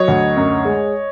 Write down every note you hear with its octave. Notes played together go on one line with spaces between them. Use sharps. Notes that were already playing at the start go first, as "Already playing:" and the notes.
Already playing: F#3 C#5 D#5
D2
F#2
G#3